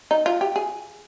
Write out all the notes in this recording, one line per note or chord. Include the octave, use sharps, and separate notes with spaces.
D#4
F4
G4
G#4